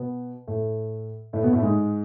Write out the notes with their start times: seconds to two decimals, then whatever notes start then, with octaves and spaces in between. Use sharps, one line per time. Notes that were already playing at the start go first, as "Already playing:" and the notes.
Already playing: B2 B3
0.48 A2 A3
1.33 A2 A3
1.43 B2 B3
1.53 A2 A3
1.62 G#2 G#3